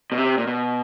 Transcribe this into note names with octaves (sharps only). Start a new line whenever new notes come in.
B2
C3
A#2
B2